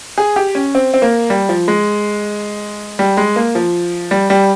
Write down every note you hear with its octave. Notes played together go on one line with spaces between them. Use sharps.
G#4
G4
C#4
C4
C4
A#3
G3
F3
G#3
G3
G#3
A#3
F3
G3
G3